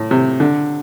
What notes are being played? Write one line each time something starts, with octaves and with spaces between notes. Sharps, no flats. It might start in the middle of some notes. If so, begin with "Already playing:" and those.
Already playing: A2
C3
D3